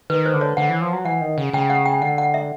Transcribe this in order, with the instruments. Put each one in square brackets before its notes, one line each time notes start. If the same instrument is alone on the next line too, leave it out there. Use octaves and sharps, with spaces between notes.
[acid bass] D#3 [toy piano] B4
[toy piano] C5
[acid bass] D3
[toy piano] C#5
[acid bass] D3 [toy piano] F#5
[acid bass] E3
F3
F#3
[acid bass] E3 [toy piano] F#5
[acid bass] D#3
C#3
[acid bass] C#3 [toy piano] G5
[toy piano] F#5
G5
[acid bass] D3 [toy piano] F#5
[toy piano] F#5
E5